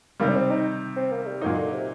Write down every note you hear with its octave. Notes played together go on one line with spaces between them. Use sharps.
C3 D#3 G3 A#3
D4
C4
D#4
C4
A#3
G3
A#2 D#3 F#3 A#3 D#4
D3
C3